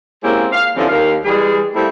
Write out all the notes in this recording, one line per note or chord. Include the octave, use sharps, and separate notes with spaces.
G#3 A#3 C4 C#4 E4 G4
F5
D3 E3 F3 G3 C4 C#4
D#2 A#4 F5
E3 G3 G#3 G#4
G3 A3 A#3 C4 E4